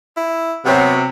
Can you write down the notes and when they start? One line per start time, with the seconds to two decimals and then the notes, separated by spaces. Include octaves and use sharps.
0.17 E4
0.65 C3 F#3 B3